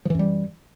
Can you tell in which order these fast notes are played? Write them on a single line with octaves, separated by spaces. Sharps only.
F3 E3 F#2 G3